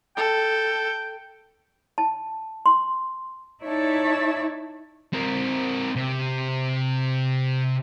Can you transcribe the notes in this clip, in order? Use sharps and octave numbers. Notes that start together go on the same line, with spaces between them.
A4 G5
A5
C6
D#4 E4 C#5 D5 E5 A5
C4 A#4
C3